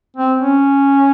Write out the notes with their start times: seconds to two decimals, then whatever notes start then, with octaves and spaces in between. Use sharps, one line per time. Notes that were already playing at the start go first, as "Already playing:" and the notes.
0.16 C4
0.40 C#4